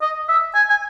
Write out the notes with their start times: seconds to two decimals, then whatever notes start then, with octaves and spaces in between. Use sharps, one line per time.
0.01 D#5
0.29 E5
0.55 G#5
0.70 G#5